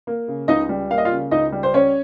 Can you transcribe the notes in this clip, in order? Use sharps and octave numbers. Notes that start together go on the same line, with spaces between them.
A#3
C#3
C#2 D#4 D#5
G3
A#3 F5
D#5
F4 F5
C#3
C#2 D#4 D#5
G3
C5
C#4 C#5